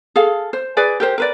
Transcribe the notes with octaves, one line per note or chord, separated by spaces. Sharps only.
G#4 A4 F5
C5
G#4 B4 D5 G#5
G4 A#4 C5
A#4 B4 D5